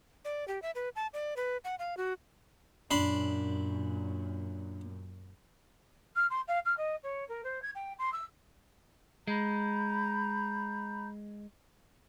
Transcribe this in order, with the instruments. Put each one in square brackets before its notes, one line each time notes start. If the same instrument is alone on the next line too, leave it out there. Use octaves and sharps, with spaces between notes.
[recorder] D5
G4
E5
B4
A5
D5
B4
F#5
F5
F#4
[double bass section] F#2 A#2 [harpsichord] D4 B5 C6
[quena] F6
C6
F5
F6
D#5
C#5
A#4
C5
G#6
G5
C6
E6
[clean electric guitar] G#3 [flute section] A#5 B5 G6